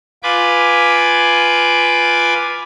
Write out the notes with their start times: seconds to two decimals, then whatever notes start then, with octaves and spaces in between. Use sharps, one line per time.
0.23 F4 B4 G#5 B5 D6